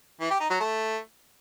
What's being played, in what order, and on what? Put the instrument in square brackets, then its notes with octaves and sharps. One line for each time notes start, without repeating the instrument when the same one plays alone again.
[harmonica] E3
G4
D#4
F#3
A3